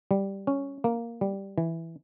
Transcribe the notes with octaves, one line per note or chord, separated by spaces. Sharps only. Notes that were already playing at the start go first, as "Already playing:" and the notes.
G3
C#4
A#3
G3
E3